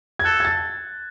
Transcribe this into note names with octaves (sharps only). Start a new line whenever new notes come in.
G#6
A4 F#6
G#6
A6